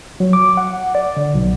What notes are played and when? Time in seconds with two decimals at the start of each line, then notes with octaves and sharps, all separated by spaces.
0.20 F#3
0.33 D6
0.57 F#5
0.95 D5
1.17 D3
1.35 B1